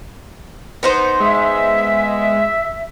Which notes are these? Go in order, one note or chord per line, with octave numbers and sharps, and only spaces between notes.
B3 D#4 C5
G#3 E5